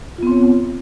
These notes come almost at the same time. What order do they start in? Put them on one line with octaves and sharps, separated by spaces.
F4 B3 C4 C#5